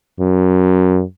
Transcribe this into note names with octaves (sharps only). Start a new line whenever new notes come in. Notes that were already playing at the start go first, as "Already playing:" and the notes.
F#2